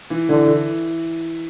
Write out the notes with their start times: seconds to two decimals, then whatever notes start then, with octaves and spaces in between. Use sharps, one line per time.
0.10 E3
0.29 D3 E3
0.47 E3